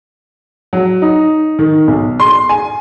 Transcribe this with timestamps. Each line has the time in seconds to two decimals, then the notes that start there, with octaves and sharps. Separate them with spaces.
0.73 F#3
1.02 D#4
1.59 D#3
1.87 B1
2.20 C6
2.49 G#5